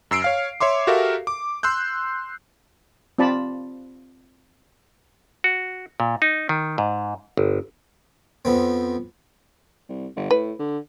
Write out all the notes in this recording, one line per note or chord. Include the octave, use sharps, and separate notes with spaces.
F#2 E6 C7 D7
C#5 F5 F6
C#5 E5 C6 D6
F#4 G4 A4 A#4 E5 F5
D6
C6 E6 F#6 G6
C4 F4 D5 A5 B5
F#4
A#2
D#4
D#3
G#2
G1
F2 B3 C4
C2
G1
A2 B4
D3